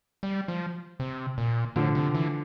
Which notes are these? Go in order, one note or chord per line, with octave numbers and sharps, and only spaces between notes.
G3
F3
C3
A#2
A2 D3 F3
C3
E3